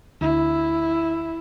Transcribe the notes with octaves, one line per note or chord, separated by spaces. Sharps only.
D2 E4